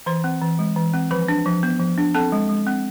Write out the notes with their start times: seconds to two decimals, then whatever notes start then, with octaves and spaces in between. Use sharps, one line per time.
0.06 E3 C5 C6
0.24 C4
0.41 E3
0.59 G#3
0.76 E3
0.94 C4
1.11 F3 B4 B5
1.28 D4
1.46 F3
1.63 B3
1.80 F3
1.98 D4
2.14 C4 A4 A5
2.32 G#3
2.49 G#3
2.67 C4